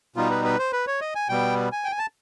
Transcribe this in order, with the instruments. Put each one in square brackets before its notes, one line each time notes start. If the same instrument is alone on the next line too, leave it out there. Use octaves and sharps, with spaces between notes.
[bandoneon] B2 G3 B3 D#4 F4
B4
B4
C5
B4
C#5
D#5
G#5
B2 G3 B3 G5
G#5
G5
G#5
A5